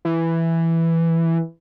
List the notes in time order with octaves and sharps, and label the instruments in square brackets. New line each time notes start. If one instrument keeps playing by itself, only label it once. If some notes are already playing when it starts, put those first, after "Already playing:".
[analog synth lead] E3